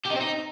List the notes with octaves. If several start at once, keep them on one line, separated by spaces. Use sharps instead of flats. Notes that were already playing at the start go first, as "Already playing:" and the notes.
G4
D#4
C4
D#4